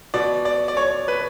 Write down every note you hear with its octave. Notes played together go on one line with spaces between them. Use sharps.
B2 D5
D5
D5
C#5
B4